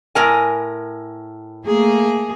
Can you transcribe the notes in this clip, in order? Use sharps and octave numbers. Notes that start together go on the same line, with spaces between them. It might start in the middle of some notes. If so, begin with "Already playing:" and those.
A2 A#4 G#5
A3 A#3 G#4